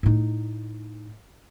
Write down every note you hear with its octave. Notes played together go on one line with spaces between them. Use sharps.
A2 D#4